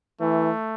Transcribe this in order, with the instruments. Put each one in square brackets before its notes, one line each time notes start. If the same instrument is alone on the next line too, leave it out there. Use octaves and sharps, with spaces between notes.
[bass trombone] E3 [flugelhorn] A3